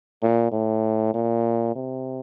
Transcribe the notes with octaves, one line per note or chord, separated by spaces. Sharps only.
A#2
A2
A#2
C3